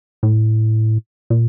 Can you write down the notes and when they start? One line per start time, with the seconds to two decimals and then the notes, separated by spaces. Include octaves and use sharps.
0.23 A2
1.30 A#2